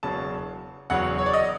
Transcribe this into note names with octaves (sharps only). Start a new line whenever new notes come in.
E1 E2 C#3 F#3 A5
E1 E2 C#3 F#3 F#5
C#5
D5
D#5